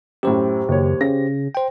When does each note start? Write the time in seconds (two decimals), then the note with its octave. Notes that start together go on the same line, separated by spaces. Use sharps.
0.23 F#2 A2 G4 C5
0.68 F#1 D#2 C#5
1.01 C#3 A#6
1.55 C5 G5